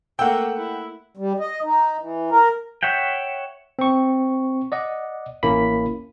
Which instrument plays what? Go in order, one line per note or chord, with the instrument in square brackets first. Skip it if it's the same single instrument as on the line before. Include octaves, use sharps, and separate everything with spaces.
[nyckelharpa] A3 A#3 [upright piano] F#5 E6 [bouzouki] G5
[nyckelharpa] E4
[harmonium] G3
D#5
D#4
E3
A#4
[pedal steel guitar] C#5 E5 F#5 G5
[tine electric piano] C4 C#6
D5 D#5 F#5
A1 A#3 C#4 E4 B5 B6